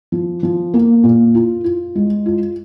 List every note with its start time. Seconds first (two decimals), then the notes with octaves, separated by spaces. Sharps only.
0.12 F3
0.43 F3
0.74 A#3
1.03 A#2
1.35 F4
1.64 F4
1.95 G#3
2.26 F4